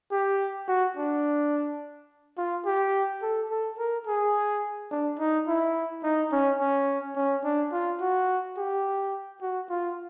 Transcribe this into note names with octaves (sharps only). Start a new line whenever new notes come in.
G4
F#4
D4
F4
G4
A4
A4
A#4
G#4
D4
D#4
E4
D#4
C#4
C#4
C#4
D4
F4
F#4
G4
F#4
F4